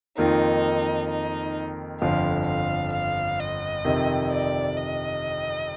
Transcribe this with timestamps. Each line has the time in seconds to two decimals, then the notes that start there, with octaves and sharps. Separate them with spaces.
0.18 F2 D#3 A#3 D#4 F4
1.10 D#4
2.01 G1 F2 D3 F3 F5
2.47 F5
2.93 F5
3.39 D#5
3.85 F2 C3 D#3
4.31 D5
4.77 D#5